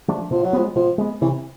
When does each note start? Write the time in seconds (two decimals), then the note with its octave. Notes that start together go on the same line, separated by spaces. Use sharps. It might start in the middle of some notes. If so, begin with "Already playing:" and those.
0.08 F3 A3 D4
0.31 B2 F3
0.44 F#3
0.53 F3 G#3 B3
0.76 B2 F3
0.98 G#3 B3
1.22 C3 E3